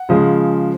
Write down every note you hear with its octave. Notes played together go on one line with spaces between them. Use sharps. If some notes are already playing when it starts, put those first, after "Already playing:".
Already playing: F#5
C#3 F3 G#3